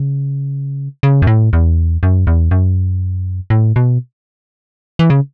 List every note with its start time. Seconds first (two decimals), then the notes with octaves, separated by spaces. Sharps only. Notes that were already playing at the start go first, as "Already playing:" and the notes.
Already playing: C#3
1.03 C#3
1.22 F#2
1.27 A2
1.53 E2
2.03 F#2
2.27 E2
2.51 F#2
3.50 A2
3.76 B2
4.99 E3
5.10 C#3